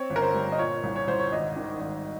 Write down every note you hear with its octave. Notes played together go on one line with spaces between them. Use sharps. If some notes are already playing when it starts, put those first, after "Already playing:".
Already playing: C4 C#5
G1
A#4
C5
G3
D#5
A#2 C#5
C2
C#5
C2 C5
C#5
G#1 D#5
D#3
G#1